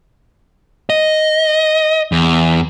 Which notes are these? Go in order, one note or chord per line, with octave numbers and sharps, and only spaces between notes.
D#5
E2